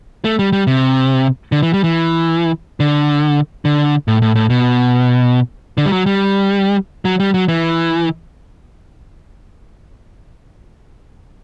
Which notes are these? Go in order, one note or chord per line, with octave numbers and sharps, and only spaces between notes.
A3
G3
G3
C3
D3
E3
G3
E3
D3
D3
A2
A2
A2
B2
D3
G3
F#3
G3
F#3
G3
F#3
E3